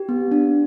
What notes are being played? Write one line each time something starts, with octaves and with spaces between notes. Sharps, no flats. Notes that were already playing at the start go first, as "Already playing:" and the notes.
Already playing: G4
B3
D4